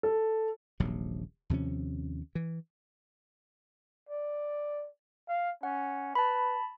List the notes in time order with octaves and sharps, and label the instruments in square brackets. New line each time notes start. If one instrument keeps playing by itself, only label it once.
[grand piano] A4
[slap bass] D#1 A#1 C3 F#3
D#2 C3 F3 C#4
E3
[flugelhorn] D5
F5
[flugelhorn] C#4 [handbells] F#5
[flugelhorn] B4 [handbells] A5 B5